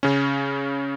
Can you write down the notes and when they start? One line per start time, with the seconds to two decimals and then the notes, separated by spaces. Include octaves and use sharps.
0.03 C#3 C#4